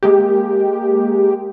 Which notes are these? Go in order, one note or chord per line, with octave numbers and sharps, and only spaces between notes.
G#3 A#3 G4